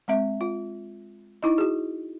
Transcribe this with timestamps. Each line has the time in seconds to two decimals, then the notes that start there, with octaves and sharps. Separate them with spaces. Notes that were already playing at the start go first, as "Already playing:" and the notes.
0.08 G#3 C4 E5
0.41 F4
1.43 D#4 E4 D#5
1.58 F#4 G#4